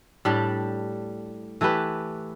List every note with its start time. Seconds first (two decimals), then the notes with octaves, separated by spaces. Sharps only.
0.25 A2 G3 D4 G4
1.61 E3 A3 G4 B4